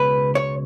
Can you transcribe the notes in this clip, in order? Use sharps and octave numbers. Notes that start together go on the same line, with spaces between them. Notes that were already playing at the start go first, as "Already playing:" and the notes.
Already playing: C#2 B2 G#3 B4
C#5